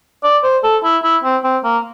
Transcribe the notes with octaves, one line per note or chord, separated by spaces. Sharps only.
D5
C5
A4
E4
E4
C4
C4
A#3